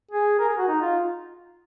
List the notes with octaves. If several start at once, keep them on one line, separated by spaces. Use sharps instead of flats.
G#4
A#4
G#4
F#4
D#4
F4